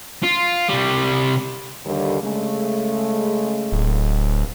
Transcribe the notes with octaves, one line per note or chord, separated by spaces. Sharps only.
F4
C3 G3
D#2 D3 G3
C#3 G#3 A3
D1